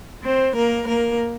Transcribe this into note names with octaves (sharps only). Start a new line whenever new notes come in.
C4 C5
A#3 A#4
A#3 A#4